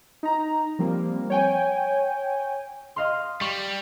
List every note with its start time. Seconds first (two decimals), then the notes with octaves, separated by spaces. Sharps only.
0.23 D#4 A#5
0.79 F3 G3 A#3 C4
1.30 C#5 G5 G#5
2.96 D#5 F5 C6
3.41 G3 C#6